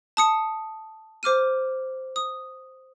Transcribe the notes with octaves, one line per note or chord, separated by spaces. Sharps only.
A5 D#6 C#7
C5 D6 F6 D#7
D#6